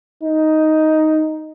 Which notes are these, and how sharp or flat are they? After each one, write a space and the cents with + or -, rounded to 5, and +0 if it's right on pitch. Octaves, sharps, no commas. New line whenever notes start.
D#4 +5